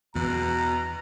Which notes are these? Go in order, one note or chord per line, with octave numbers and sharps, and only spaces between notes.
E2 B2 E3 A#5